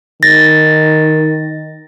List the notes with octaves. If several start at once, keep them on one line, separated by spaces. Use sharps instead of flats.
D#3 A6 A#6